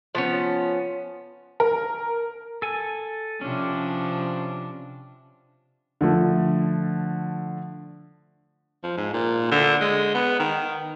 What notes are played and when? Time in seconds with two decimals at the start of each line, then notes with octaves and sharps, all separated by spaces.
0.15 F3 B3 C#4
1.60 A#4
2.62 A4 G#5
3.41 C3 F3 C#4 D4
6.01 D3 F3 A3
8.84 F3
8.97 G#2
9.13 A#2
9.51 D3
9.81 G#3
10.15 B3
10.39 D#3